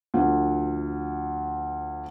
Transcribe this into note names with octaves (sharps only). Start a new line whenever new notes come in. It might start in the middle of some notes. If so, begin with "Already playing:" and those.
D2 F3